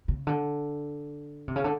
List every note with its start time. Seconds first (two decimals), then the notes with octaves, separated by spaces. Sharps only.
0.08 C#3
0.27 D3
1.48 C3
1.56 C#3
1.64 D3